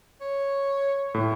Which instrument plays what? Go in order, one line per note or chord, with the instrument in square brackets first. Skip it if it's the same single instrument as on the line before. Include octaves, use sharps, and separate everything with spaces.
[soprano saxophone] C#5
[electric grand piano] A2